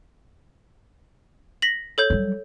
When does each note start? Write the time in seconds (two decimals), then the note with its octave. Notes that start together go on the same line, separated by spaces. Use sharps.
1.62 A#6 B6 F#7
1.98 A4 C#5 G6
2.10 F#3 G3